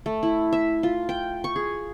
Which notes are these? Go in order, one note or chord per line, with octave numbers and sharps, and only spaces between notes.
A3
E4
E5
F4
G5
C#6
G#4